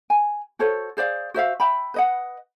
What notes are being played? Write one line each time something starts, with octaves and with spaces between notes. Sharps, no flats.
G#5
F#4 A4 C5 C#5
G#4 C5 D5 F5
F#4 C5 E5 F5
E5 G5 B5
B4 D#5 F#5